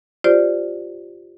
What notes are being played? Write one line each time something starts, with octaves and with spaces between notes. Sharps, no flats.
F4 G4 C5 D5